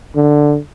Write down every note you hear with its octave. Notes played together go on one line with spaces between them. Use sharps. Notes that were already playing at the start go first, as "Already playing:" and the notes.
D3